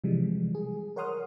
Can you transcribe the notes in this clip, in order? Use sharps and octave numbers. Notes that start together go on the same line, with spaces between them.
C3 E3 F3 G3 G#3
G#4
A#4 C#5 F#5 C6 D#6 F6